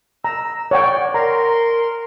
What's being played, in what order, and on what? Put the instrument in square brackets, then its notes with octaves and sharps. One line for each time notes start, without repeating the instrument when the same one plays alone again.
[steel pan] A#5 [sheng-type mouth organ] E6
[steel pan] C#5 F#5 G5 [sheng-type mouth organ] D5
[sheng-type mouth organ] A#4 C6 [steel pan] A#5